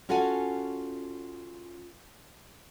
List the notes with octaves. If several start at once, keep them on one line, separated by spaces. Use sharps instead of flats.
C#4 F4 F#4 A4 F#5 G#5